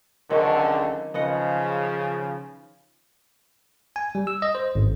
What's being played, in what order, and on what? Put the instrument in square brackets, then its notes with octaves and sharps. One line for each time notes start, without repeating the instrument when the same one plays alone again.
[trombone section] C#2 D3 [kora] D#3 F#3 C4
[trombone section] C#3 F3 [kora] B3 D#5 F#5
[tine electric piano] G#5
G3
E6
D#5
C5
G#1